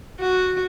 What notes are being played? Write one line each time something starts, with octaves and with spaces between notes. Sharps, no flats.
F#4